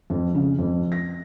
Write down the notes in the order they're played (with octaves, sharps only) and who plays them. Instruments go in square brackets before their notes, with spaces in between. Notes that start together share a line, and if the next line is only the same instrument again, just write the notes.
[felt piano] F2
C#3
F2
A#6